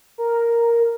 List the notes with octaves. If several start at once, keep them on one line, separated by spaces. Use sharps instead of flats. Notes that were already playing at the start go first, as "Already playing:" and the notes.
A#4